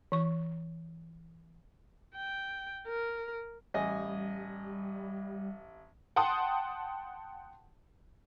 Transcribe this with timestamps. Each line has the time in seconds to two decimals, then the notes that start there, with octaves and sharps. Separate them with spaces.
0.12 E3 C#6
2.16 G5
2.88 A#4
3.74 A1 G3 D#5 G#5
6.16 F#5 G5 A5 C6 D#6